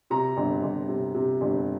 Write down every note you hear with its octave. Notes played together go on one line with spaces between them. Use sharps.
C3 A#5
G1
G1
C3
C3
G1